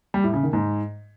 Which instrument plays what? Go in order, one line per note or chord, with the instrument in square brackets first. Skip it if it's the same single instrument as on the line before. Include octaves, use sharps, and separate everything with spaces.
[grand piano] G3
A2
C#3
D#3
G#2